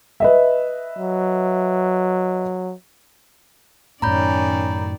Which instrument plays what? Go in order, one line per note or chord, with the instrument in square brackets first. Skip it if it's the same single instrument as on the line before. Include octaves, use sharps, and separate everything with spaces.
[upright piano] B4 D#5 E5
[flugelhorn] F#3
[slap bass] F#2 A2 [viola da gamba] D#3 D5 [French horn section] C#4 [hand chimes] A#5 B5 G6